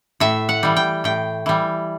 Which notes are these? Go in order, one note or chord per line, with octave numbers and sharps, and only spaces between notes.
A2 E5
F#5
E3 G3
G5
A2 G5
E3 G3